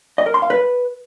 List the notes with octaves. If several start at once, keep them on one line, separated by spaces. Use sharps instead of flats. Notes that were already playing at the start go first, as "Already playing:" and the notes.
D#5
A#4
C6
F5
B4